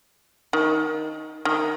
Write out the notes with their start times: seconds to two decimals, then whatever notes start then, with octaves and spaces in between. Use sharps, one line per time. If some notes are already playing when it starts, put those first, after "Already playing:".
0.53 D#3
1.45 D#3